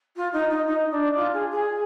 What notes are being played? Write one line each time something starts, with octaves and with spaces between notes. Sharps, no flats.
F4
D#4
D#4
D#4
D4
F4
G#4
G#4